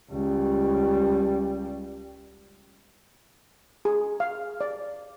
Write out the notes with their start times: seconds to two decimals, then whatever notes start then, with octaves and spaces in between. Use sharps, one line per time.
0.10 C#2 G3
3.85 G#4
4.20 F5
4.61 D5